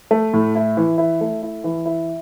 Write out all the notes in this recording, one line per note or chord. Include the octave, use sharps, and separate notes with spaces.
A3
A2
E4
E3
E4
A3
E4
E3
E4